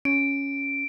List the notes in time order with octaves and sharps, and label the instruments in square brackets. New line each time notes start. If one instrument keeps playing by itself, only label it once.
[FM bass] C#4 [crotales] D7